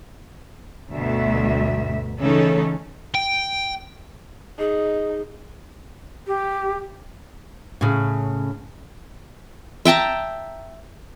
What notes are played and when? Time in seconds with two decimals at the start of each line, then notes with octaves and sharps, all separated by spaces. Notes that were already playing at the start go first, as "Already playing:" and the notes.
0.91 D2 G2 B2 E5
2.19 C#3 E3 A3 C#4 D#4 A4
3.14 G5
4.58 D#4 G#4
6.27 G4
7.81 A2 C#3
9.85 E5 G5 A5 A#5